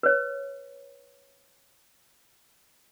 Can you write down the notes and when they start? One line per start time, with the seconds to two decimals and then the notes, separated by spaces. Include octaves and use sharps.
0.03 B4 C#5